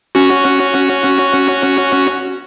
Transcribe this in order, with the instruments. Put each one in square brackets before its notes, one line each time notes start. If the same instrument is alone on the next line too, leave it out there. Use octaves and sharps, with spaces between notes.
[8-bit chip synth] C#4 F#4